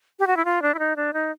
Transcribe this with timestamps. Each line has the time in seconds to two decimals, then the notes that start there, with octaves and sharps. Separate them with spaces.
0.19 G4
0.27 F#4
0.37 E4
0.45 F4
0.62 D4
0.74 E4
0.79 D#4
0.96 D4
1.13 D#4